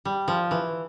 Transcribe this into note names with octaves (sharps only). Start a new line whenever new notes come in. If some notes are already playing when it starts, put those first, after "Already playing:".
G3
F3
E3